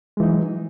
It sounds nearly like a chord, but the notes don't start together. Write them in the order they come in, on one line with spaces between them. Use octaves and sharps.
G#3 E3 D#4 F#3